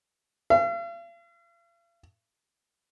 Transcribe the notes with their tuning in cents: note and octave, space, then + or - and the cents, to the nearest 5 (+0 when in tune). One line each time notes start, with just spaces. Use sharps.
F5 -45